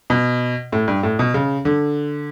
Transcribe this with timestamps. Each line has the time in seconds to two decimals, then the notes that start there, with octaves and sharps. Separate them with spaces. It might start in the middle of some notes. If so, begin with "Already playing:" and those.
0.10 B2
0.72 A2
0.88 G2
1.03 A2
1.19 B2
1.34 C#3
1.65 D3